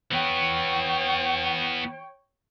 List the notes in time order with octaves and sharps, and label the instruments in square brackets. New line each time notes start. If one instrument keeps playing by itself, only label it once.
[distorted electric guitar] E3 B3 [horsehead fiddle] C#5 G5